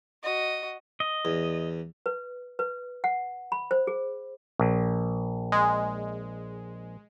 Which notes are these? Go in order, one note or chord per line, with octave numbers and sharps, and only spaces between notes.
F#4 D#5
D#5
E2
B4
B4
F#5
B5
C5
G#4
A#1
G#3